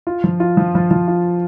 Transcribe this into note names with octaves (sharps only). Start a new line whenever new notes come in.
F4
F3
F4
F3
F3
F3
F4